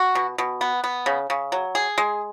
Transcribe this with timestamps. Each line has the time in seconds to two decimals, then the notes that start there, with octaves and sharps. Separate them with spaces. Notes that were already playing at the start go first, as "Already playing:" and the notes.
Already playing: F#4
0.15 B2
0.38 B2
0.61 B3
0.84 B3
1.06 C#3
1.30 C#3
1.52 F#3
1.75 G#4
1.98 G#3